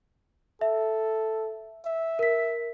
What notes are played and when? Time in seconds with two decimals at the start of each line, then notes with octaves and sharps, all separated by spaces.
0.61 A4 E5
1.85 E5
2.19 A#4 B6